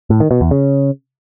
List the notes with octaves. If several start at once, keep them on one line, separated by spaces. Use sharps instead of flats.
A2
D#3
B2
E2
C#3